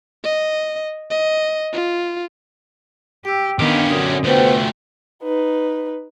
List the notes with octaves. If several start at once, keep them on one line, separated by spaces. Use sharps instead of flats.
D#5
D#5
F4
G4 G5 E6
D#3 B3 C#4 D4 G4 F5
F#2 D3 D#6
F3 A3 B3 F#4 C5 G5
D#4 B4